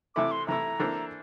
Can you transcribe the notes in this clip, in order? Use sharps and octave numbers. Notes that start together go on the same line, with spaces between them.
C3 E3 A3 E4 D6
C6
C3 E3 A3 E4 A#5
E3 A#3 D4 A4 C5